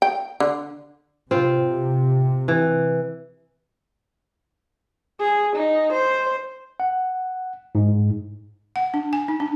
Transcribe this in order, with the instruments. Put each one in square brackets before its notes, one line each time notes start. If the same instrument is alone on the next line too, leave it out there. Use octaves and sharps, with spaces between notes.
[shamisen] G5
D3
[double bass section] C3 [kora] C4 F4
[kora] E3
[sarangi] G#4
D#4
C5
[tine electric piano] F#5
G#2
[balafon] F#5
D4
G#5
D#4
D4